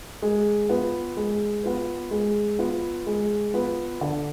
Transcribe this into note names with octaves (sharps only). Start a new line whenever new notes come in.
G#3
B3 F4 B4
G#3
B3 F4 B4
G#3
B3 F4 B4
G#3
B3 F4 B4
D3